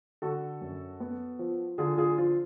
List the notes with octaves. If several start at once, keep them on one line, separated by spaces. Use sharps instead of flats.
D3 F#4 A4
F#2
B3
F3
D3 F4 G#4
F4 G#4
F3 F4